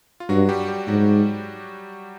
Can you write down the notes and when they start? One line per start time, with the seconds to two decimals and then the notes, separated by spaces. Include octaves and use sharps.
0.20 F4
0.29 G2 F#3 F#4
0.49 G3 G4
0.68 G3 G4
0.87 G#2 F#3 F#4